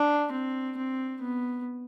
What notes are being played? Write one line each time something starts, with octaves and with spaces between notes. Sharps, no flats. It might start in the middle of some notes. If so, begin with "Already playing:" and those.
Already playing: D4
C4
C4
B3